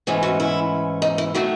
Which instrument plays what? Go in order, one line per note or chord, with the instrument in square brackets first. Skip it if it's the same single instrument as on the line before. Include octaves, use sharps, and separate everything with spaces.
[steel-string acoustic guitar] G#2 E3 A3 C#4 G#4
F#4
E4
D#4
E4
D#3 F#3 A3 F#4